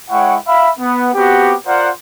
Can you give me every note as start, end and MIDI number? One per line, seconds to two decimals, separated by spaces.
0.10 0.36 56
0.10 0.36 64
0.10 0.36 73
0.10 0.36 78
0.10 0.36 79
0.10 0.36 85
0.46 0.70 76
0.46 0.70 77
0.46 0.70 83
0.79 1.09 59
1.14 1.55 59
1.14 1.55 60
1.14 1.55 66
1.14 1.55 67
1.66 1.89 65
1.66 1.89 70
1.66 1.89 72
1.66 1.89 74
1.66 1.89 78